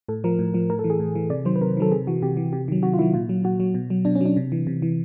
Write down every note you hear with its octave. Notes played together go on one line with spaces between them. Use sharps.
A2 A4
F3 A#4
A2
F3
A2 A#4
A4
E3
G#4
A2
E3
C3 D5
D#3 F#3 C5
B4
C3 A#4
D#3 F#3 A4
C3 G#4
E3 F#4
C3 G4
E3
C3 G4
D#3 F#3
C3 F#4
F4
D#3 F#3 E4
A#2 F4
F#3
A#2 F#4
F#3
B2
F#3
B2 D4
C#4
F#3 D4
C3
E3
C3
E3